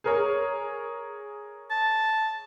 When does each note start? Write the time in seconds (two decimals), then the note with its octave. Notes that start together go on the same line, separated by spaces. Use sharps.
0.04 G#4 A#4 C#5
1.70 A5